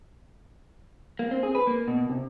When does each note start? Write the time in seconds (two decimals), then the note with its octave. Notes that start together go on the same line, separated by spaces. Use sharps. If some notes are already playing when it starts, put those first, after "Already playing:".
1.19 A#3
1.31 C4
1.43 G#4
1.55 B4
1.67 A#3
1.88 B2
2.09 C3